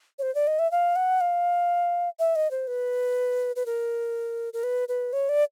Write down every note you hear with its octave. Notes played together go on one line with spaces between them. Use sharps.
C#5
C5
D5
D#5
E5
F5
F#5
F5
E5
D#5
C5
B4
B4
A#4
A#4
B4
B4
C#5
D5